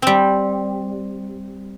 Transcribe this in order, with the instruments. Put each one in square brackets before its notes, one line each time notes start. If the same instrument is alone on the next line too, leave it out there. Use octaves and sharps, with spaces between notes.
[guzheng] G3 C4